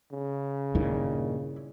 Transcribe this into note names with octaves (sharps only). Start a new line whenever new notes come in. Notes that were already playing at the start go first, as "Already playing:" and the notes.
C#3
G2 A#2 D#3 E4